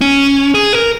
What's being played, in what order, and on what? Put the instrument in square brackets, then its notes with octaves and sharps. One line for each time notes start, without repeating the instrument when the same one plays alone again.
[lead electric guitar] C#4
G#4
A#4